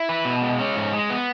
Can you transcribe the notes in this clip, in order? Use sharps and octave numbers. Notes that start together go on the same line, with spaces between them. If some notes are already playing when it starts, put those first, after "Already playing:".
Already playing: E4
B4
B2
G#3
C#4
G#2
G#3
B3